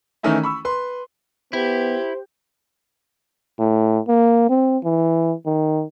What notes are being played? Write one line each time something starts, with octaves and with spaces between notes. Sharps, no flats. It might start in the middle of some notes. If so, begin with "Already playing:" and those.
D#3 E3 A3 C#4 D#4 E4
B5 C#6 E6
B4 C6
B3 E4 G4 C5
A2
A#3
C4
E3
D#3